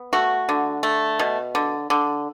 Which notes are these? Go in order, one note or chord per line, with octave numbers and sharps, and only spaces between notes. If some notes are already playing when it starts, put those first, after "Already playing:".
Already playing: B3
A3 F#4
D3
A3
B2
D3
D3